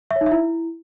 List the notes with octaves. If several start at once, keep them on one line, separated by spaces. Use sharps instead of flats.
E5
C#5
D#4
E5
E4